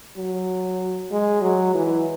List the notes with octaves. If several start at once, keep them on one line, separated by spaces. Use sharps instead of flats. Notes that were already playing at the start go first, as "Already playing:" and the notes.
F#3
G#3
F#3
E3